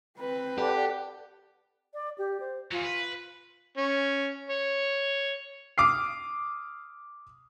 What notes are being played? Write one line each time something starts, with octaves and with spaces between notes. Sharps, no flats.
C4 B4
G4 A4 D5 F#5
D5
G4
C5
E3 F#3 F4
B4
C#4
C#5
D6 D#6 F6 C7